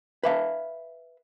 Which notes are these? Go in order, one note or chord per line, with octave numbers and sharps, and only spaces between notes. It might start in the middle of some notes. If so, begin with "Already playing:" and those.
B4 E5 F5